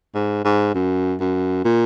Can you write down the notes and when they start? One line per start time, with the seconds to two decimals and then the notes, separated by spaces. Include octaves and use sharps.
0.15 G#2
0.45 G#2
0.75 F#2
1.20 F#2
1.65 A#2